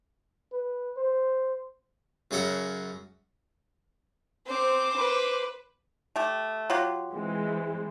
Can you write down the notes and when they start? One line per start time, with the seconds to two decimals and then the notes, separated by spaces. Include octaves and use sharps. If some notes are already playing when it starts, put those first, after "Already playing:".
0.52 B4
0.97 C5
2.31 F#2 C#3 G#4 A4 F#5 A#5
4.47 C4 C5 D6
4.96 B4
6.16 A3 G4
6.70 F#3 F4 G4
7.12 E3 G#3 C4